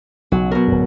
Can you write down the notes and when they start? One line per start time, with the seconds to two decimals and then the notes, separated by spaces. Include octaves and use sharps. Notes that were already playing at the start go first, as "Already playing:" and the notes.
0.32 B1 C#3 F#3
0.51 B2 A#4
0.68 D1 F#2